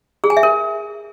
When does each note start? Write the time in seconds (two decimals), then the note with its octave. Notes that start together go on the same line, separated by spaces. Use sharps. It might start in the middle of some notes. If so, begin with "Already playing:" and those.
0.24 G#4
0.30 G#5
0.37 E5
0.43 A#4